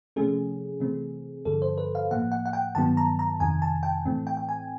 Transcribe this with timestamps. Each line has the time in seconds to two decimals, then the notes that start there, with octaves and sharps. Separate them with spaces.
0.16 C3 F3 A3 C#4 G#4
0.80 C3 E3 A3 C4
1.45 G2 D3 F3 A4
1.62 C5
1.78 B4
1.95 F5
2.11 A2 F3 A#3 F#5
2.32 F#5
2.46 F#5
2.53 G5
2.75 G2 D#3 F#3 B3 A5
2.97 A#5
3.19 A#5
3.40 F2 C3 D#3 G#5
3.62 A5
3.83 G5
4.05 A2 E3 A3 C4
4.27 G5
4.37 G5
4.49 G#5